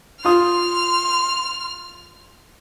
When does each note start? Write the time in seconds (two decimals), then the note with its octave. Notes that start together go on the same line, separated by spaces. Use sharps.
0.25 F4 C6 D#6 F6